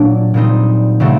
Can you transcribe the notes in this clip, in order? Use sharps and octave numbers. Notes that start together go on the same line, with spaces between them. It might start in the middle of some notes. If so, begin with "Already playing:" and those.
Already playing: A#2 F#3 A#3 D4
A#2 G3 C4 D#4
C#3 F#3 A3 C4